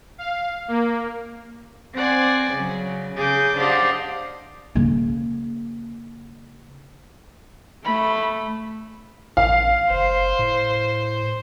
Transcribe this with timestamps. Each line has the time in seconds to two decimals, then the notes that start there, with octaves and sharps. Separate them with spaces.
0.18 F5
0.68 A#3
1.95 C4 C5 D5 F#5 G#5
2.53 C#3 F#3
3.16 C#3 G#4 D6 G6
3.58 D4 G4 C5 D#5 F5 F#5
4.75 C#3 A#3
7.85 A3 B5
9.37 A1 F5
9.90 F#1 C5
10.39 A2